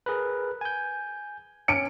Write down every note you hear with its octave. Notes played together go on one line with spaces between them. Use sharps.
G#4 A#4 B4
G#5 G6
C#4 C#7 D7